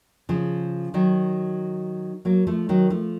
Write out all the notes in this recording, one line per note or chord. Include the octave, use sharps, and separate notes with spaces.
C#3 F3
D#3 F#3
F#3 A#3
F3 A3
D#3 F#3
F3 A3